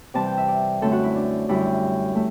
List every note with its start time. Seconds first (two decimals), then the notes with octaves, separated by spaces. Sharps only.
0.14 C3 E3 G3 C4 A5
0.26 G5
0.37 E5
0.48 D5
0.82 F#2 D3 A3 C4 A4
0.92 F#4
1.03 E4
1.16 D4
1.48 F#2 D3 G3 E4
2.15 A3